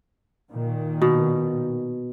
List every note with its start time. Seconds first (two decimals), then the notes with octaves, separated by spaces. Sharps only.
0.49 A#2 D#3
1.02 B2